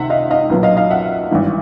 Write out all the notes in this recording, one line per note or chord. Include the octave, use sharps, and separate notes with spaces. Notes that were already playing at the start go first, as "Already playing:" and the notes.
Already playing: C#2 C3 D#3 E5 F#5
D#5 F5
D#5 F5
B1 A#2 F#3 B3
D#5 F5
D#5 F5
E5 F#5
G#1 G2 E3